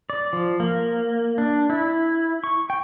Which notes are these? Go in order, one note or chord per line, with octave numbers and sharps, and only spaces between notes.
D5
F3
A#3
D4
E4
C#6
G5